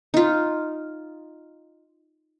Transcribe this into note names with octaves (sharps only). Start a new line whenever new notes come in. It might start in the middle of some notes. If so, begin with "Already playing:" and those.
D#4 F4